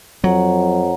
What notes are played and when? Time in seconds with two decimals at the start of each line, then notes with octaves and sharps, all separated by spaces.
0.24 F2 F#3 C#5 F#5 A#5